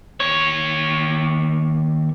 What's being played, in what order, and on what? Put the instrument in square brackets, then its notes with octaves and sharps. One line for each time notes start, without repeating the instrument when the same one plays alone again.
[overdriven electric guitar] D#2 C#5